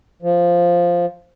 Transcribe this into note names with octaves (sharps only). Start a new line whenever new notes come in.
F3